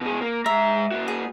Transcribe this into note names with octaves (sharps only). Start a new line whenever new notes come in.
B2 G#4
A#3
G#3 E5 A#5
A#3 F#4
G#4